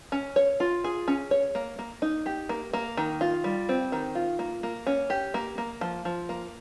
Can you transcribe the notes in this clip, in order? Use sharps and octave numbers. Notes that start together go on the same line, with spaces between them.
C#4
C#5
F4
G#4
C#4
C#5
A#3
A#3
D#4
G4
A#3
A#3
D#3
F4
G3
C4
D#3
F4
A#3
A#3
C#4
G4
A#3
A#3
F3
F3
A#3